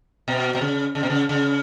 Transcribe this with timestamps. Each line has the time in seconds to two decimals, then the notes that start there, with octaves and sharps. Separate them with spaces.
0.28 B2
0.55 B2
0.61 C#3
0.95 C#3
1.03 B2
1.10 C#3
1.29 C#3